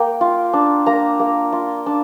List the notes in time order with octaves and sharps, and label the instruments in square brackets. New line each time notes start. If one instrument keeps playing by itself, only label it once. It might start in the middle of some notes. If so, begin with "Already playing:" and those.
Already playing: [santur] A#3 G5
F4
D4
A#3 A#5
A#3
F4
D4